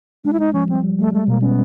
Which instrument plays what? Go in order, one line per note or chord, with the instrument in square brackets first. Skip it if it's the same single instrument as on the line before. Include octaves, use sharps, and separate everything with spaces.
[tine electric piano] G#3 [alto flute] D4
[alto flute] E4
[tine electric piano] G#3 [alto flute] D#4
[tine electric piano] F3 [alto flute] C#4
[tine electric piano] G3 [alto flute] C4
[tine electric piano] G3
[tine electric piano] G3 [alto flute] A3
[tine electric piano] G#3 [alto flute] A3
[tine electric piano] B2 [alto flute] A#3
[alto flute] B3 [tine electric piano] C#4